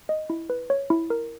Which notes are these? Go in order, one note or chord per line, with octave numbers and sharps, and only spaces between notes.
D#5
E4
B4
C#5
E4
A#4